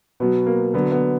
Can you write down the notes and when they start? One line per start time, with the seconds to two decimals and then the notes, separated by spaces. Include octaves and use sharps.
0.20 B2 F#3 B3
0.46 A#3
0.74 D3 F#3 B3
0.92 B3